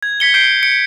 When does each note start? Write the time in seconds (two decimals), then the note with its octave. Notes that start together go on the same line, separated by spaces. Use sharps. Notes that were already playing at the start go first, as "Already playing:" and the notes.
0.03 G#6
0.20 G#6 B6 C#7 G7
0.34 G6 C7 D7 G7
0.63 C#7 D7